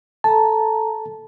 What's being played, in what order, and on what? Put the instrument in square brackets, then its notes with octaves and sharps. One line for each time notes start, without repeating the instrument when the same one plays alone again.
[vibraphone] A4 A#5 [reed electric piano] A5